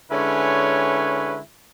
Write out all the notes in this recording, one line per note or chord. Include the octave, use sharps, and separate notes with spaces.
D3 G#3 C#4 E4 B4 C#5